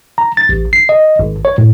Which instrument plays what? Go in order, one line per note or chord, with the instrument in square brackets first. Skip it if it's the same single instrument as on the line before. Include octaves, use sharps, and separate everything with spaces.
[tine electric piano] A#5
A6
A1
C7
D#5
G#1
C#5
A2